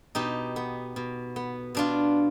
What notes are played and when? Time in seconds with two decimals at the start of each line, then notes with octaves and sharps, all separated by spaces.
0.15 B2 D#4 G4
0.56 B3
0.96 B2
1.36 B3
1.75 B2 D4 F4